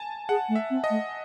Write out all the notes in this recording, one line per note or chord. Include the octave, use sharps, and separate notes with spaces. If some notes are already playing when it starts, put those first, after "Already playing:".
Already playing: G#5 A5
G#4 F#5
A3
E5
C4
D#5
A3